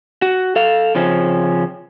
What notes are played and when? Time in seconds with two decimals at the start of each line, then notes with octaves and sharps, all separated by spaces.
0.22 F#4
0.56 A4 F5
0.95 C#3 F3 C4 C#4